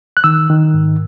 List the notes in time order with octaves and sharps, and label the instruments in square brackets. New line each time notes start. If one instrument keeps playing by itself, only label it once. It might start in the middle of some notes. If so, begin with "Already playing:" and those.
[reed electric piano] F#6
D#3 E6
D#3
G#2